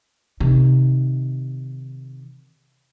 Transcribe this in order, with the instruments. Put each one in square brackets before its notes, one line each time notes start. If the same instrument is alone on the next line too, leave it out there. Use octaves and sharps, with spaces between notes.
[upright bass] C3 D#3